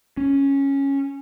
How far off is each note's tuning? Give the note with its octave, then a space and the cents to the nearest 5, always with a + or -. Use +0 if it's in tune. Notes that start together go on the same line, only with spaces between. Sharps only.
C#4 -5